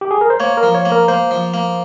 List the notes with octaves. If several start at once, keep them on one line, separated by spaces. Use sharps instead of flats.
G4
G#4
A#4
C5
A#3 C#5
A#4
F3
C#5
A#3
A#4
A#3 C5
F3
A#3